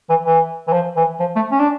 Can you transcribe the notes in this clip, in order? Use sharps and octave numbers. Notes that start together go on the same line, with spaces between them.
E3
E3
E3
F3
E3
F3
A3
C#4
D4